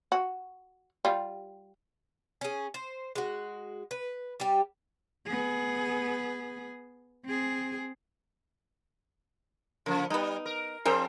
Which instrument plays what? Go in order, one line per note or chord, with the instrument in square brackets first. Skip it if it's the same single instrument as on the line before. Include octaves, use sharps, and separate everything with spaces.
[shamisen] F#4
G3 F4
[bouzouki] C#4 G#4
C5
G#3 F#4
B4
G3 G4
[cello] B3 G#4
C4 G#4
[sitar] C#3 F3 [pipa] A#3
[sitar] G3 [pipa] B3 D#4
[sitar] A#4
[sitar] F2 C4 C5 [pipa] G#4 A#4 G5